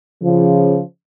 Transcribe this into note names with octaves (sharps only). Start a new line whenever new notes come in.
C#3 F3